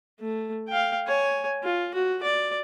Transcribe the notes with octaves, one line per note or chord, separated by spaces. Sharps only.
A3
F5 G5
C#5 G#5
F4
F#4
D5